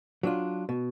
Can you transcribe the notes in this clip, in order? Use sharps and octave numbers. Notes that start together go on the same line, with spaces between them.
F#3 D4 F4
B2